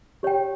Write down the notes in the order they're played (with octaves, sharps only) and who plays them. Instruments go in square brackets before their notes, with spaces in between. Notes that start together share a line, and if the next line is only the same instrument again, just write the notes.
[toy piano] G4 C#5 G5